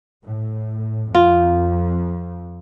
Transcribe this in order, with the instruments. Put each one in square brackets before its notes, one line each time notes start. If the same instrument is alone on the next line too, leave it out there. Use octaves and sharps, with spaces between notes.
[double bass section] A2
[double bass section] F2 [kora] F4